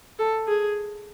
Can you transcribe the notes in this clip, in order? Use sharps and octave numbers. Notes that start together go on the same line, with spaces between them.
A4
G#4